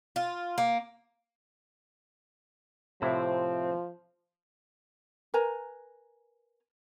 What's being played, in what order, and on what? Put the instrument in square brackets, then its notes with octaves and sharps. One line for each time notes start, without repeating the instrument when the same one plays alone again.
[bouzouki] F4
A#3
[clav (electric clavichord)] A2 C3 E4 [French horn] F3 [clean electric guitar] C4
[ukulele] A#4 B4 G#5 A#5